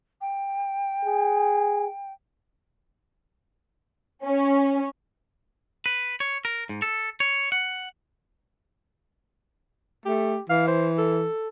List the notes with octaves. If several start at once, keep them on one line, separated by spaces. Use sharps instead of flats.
G5
G#4
C#4
B4
C#5
A#4
G#2
A4
C#5
F#5
A3 G4
E3 F5
C5
A4